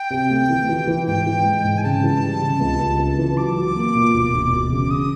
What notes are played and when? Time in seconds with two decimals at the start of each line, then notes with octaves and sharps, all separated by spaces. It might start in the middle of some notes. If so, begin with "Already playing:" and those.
Already playing: G5
0.10 C3
0.31 A3
0.49 E3
0.69 E3
0.87 E3
1.07 G#2 G5
1.26 E3
1.45 G#3
1.64 G#2
1.77 G#5
1.83 C#3 A5
2.03 E3
2.22 G3
2.41 C#3
2.60 C#2
2.79 C#2
2.98 C#2
3.18 E3
3.37 F#3 D6
3.56 F#3
3.76 A#3
3.95 A#2
4.14 E1
4.33 E1
4.52 E1
4.71 C#3
4.91 D#6